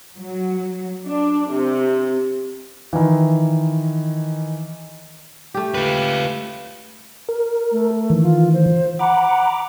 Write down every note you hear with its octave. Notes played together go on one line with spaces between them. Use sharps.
F#3
D4
C3
D#3 E3
A3 G4
F4 B4
A#4
A3
D#3 E3
F4
C5
F#5 A#5 B5 D6